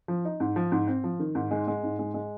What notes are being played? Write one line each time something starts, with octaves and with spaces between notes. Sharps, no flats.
F3
D#4
G#2
F3
G#2
C4
F3
D#3
G#2
G#3
G#3
G#2
G#3
G#3